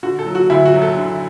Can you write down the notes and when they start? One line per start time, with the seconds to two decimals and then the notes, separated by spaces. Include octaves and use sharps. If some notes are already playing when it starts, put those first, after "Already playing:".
0.03 D3 F#4
0.19 A4
0.26 F#3
0.35 F#4
0.50 D2 E4
0.65 F#4
0.73 F#3
0.82 A4
0.97 D3